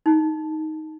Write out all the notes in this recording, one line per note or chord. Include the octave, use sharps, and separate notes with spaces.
D#4